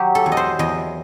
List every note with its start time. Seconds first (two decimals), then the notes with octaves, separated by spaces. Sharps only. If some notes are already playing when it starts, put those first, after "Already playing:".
Already playing: F#3 G4
0.15 A4
0.26 E2
0.32 D#5
0.37 C5
0.59 E2 D#5